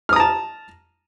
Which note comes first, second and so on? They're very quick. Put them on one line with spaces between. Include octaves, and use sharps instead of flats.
F6 D#6 A#5 A5